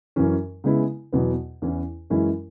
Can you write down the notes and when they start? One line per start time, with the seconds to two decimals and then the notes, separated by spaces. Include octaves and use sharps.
0.16 F#2 E3 C#4
0.64 C#3 G#3 B3 E4
1.13 E2 B2 F#3 B3
1.62 E2 E3 C#4 E4
2.10 F#2 E3 G#3 C#4 E4